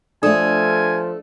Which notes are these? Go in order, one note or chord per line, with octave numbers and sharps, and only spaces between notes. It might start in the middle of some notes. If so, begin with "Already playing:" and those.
F3 A3 D4 A4 D5 G#5 D#6